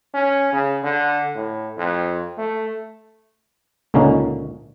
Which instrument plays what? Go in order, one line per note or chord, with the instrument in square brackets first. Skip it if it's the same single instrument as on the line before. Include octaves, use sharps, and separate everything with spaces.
[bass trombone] C#4
C#3
D3
A2
F2
A3
[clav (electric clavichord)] C#2 A#2 D3 A#3 C#4 D#4